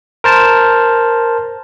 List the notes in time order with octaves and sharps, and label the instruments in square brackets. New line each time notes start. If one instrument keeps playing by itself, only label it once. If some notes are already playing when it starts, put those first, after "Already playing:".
[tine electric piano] A#4 C5 A5